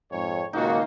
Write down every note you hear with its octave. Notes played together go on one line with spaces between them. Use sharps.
F2 G#2 C#5
C#2 A#2 D#3 A#3 D#4 F#4